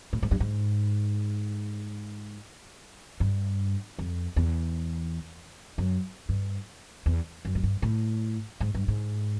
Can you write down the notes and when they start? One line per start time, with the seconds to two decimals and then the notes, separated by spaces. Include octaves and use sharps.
0.13 A2
0.22 G#2
0.31 G2
0.40 G#2
3.20 G2
3.99 F2
4.36 E2
5.78 F#2
6.29 G2
7.06 E2
7.45 F#2
7.55 G#2
7.63 G2
7.82 A2
8.60 G#2
8.75 G2
8.88 G#2